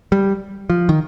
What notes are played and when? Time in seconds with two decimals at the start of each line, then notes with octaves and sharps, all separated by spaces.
0.12 G3
0.70 F3
0.89 D#3